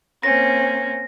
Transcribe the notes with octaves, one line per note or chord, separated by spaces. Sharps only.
A#3 C4 C#4 A#6